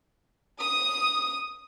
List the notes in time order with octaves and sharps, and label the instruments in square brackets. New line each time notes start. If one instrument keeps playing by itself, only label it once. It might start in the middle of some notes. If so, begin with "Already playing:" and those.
[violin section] D#6